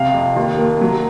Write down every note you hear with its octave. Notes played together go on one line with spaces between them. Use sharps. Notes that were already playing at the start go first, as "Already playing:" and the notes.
Already playing: C3 F5
F2
D#2
A#3
F#3